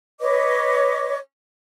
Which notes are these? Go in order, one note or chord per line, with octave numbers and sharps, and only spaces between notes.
B4 C#5 D#5 D6